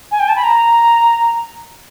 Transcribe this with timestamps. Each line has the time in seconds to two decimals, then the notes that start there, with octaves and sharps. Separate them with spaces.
0.11 G#5
0.19 G5
0.28 A5
0.36 B5
0.43 A#5